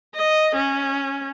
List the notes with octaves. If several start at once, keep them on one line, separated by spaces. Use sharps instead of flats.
D#5
C#4